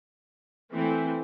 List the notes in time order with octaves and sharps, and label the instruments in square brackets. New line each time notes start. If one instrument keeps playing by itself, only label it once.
[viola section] E3 A3 C4